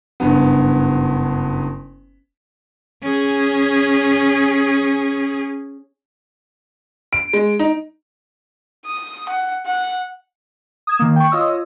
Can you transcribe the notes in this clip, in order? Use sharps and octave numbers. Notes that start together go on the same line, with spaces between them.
F#1 G2 B3
C#4 G#4
D7
G#3
D#4
D#6
F#5
F#5
D#6 G#6 E7
D#3 A#3
G5 C#6
F4 C#5 D#5 D#6 E6